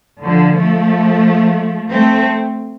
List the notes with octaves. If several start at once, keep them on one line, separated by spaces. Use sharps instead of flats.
D3 F3
F3 A3
A3 C4